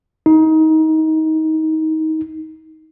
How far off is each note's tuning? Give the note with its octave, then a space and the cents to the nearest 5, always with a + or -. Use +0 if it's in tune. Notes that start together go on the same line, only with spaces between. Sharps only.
D#4 +25